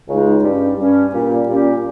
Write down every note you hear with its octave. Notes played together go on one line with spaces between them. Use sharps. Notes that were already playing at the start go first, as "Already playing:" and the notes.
C#2 C#3 G#3 D#4
G2 G3 C#4
G2 G3 C#4
A#2 G3 C#4 G4
A#2 G3 C#4 G4